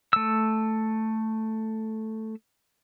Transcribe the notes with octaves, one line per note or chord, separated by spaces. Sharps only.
A3 E6